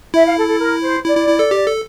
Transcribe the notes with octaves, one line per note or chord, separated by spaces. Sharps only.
E4 E5
F5
A4
A4
A#4
C5
E4 D5
E4
E4
A4
G4
A4